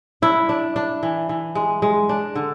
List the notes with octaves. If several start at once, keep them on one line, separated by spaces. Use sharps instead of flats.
D4 E4
D4
D4
E3
E3
G#3
G#3
D4
D3